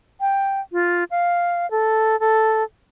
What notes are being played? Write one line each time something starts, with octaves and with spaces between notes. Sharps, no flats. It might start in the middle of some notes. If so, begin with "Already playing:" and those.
G5
F4
F5
A4
A4